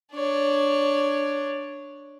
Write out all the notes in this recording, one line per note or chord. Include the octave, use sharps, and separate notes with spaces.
D4 C#5